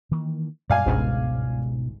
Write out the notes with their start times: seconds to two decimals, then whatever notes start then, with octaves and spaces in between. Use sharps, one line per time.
0.11 D#3 E3 A#3
0.70 F#2 A#2 G3 D5 F5 G#5
0.86 G1 C#2 G#2 B2